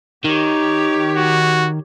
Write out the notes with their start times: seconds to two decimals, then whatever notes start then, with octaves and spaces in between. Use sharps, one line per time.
0.25 D#3 G4 C#5
1.17 F#4